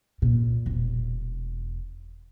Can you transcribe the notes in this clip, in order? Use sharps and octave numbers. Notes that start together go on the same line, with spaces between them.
A#2
E1